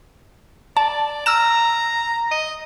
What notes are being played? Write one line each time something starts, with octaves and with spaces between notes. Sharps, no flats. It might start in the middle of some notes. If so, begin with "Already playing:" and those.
D5 A5
A#5 E6 F6 E7
D#5